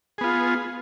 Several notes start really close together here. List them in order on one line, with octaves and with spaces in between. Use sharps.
G#4 B3 F4